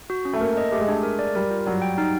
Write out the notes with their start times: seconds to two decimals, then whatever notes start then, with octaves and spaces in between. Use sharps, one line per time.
0.10 F#4
0.25 C#4
0.33 A3
0.41 A#3 A#4
0.57 D#5
0.72 A3 G4
0.81 G#3
0.88 A3 D4
1.03 A#4
1.19 D5
1.35 G3 A#4
1.51 F4
1.66 F#3 D5
1.82 G5
1.98 D#4